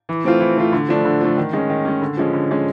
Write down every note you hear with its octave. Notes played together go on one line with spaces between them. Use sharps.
E3
A3 C4 F4
E3
A3 C4 F4
D3
F3 A3 D4
D3
F3 A3 D4
D#3
G#3 C#4
D#3
G#3 C#4
D3
F3 G#3 C#4
D3
F3 G#3 C#4